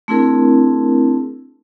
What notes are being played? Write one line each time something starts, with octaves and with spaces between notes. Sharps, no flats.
A3 C4 D4 E4 G#4 A#4